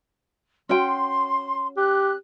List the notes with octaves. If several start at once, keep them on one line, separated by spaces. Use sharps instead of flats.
C#4 F#4 G5 C6
G4 F#6